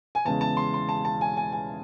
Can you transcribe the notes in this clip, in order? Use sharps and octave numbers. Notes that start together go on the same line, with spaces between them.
G#5
E2 C#3 G#3 A5
A5
C6
C6
A5
A5
G#5
G#5
G#5